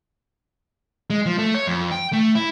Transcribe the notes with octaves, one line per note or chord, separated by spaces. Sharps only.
G#3
F3
A3
C#5
F2
G5
A3
E4